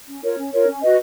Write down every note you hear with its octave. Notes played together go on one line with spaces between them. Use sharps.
C#4
F4 A#4 C#5
C#4
F4 A#4 C#5
C#4
F#4 B4 D#5